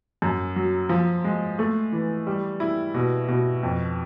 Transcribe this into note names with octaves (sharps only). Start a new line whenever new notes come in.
F#2
F#3
F3
G#3
A3
E3
G3
E4
B2
B2
F2